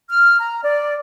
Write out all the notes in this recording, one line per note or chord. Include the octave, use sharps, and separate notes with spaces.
F6
A#5
D5